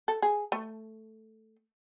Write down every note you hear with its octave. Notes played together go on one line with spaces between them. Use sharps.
A4
G#4
A3